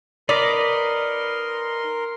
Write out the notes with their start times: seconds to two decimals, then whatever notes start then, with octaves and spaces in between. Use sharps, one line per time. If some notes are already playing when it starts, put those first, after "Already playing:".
0.29 D#4 A#4 B4 D5 D#5 C6